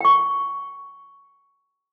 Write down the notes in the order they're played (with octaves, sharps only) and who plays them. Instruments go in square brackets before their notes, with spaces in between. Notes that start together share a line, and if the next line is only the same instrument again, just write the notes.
[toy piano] G5 C#6